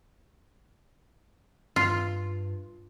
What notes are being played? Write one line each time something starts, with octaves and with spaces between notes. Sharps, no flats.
G2 F4